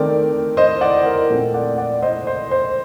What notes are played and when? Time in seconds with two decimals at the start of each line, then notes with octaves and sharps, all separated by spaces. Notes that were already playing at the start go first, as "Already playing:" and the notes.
Already playing: D#3 A3 C4 A#4 D5
0.57 C5 D#5
0.81 D5 F#5
1.06 A#4
1.30 A#2 A3 C4
1.54 D5 F#5
1.78 D5 F#5
2.02 C5 D#5
2.27 C5
2.51 C5